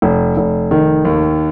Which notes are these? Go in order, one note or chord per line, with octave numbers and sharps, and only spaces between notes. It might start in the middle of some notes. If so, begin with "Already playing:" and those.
F1
F1
D#3
D#2